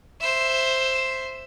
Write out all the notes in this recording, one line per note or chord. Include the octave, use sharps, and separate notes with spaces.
C5 E5